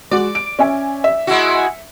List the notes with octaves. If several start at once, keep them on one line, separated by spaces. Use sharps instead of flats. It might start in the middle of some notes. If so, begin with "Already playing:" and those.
G#3 F#4 D5
D7
C#4 E5 G#5
E5
G#3 E4 F#4